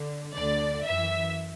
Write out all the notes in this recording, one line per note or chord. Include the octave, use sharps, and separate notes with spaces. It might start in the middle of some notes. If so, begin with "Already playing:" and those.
Already playing: D3
D2 D3 D5
F#2 E3 E5